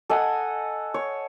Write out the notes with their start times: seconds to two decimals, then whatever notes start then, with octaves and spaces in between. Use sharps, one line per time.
0.10 A4 D#5 F#5 G#5
0.94 C#5